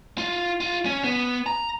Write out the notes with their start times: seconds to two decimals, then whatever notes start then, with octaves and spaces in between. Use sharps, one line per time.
0.18 F4
0.61 F4
0.86 C#4
1.04 B3
1.46 A#5